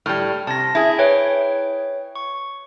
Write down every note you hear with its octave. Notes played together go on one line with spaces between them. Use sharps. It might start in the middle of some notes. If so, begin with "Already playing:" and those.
A2 G3 F6
C3 A5 A#6
E4 G#4
B4 C#5 G5
C#6